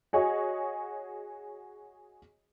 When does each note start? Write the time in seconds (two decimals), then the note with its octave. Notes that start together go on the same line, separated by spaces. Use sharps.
0.13 F#4 G#4 C#5 D#5